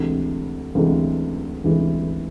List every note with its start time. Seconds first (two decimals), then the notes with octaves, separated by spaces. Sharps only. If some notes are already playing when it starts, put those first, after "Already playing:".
Already playing: D2 C3 E3 G#3
0.75 D2 C3 E3 G#3
1.64 D2 C3 E3 G#3